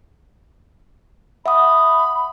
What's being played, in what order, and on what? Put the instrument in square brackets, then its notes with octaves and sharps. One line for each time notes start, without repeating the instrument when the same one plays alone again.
[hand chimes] E5 F#5 D#6 [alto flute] B5